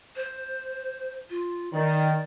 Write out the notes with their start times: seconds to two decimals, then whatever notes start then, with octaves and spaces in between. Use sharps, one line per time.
0.16 C5
1.30 F4
1.73 D#3 D5